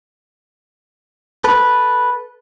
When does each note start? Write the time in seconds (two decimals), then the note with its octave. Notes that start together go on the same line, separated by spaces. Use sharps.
1.44 A4 B4